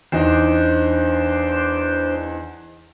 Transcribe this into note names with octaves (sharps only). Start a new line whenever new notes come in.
E2 D4 D#4 C5